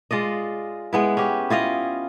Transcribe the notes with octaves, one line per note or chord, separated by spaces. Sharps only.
G#3 F4 D5 D#5
G#3 B3 E4
C#4 G4
E4 F4 D#5 F5